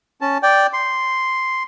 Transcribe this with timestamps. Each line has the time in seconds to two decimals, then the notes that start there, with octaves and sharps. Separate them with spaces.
0.21 C#4 A5
0.43 D5 G5
0.73 C6